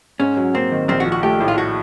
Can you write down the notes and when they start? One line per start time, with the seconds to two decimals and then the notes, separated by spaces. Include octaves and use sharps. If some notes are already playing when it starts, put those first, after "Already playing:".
0.19 G#2 C#4
0.37 F#3
0.54 A#3 C4
0.72 D#3
0.88 A#1 C4
1.00 F#4
1.06 F3
1.12 F#4
1.23 A3 G4
1.40 A2
1.48 F4
1.58 F#4